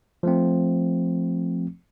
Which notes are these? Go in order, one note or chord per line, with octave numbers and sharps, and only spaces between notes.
F3 A3 C4